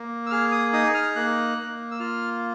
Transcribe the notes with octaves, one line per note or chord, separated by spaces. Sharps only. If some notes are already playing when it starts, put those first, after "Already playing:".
Already playing: A#3
E6
G#4 F6
D#6
D#4 D#6
F6
A#3 F#6
A#3
E6
F4 F6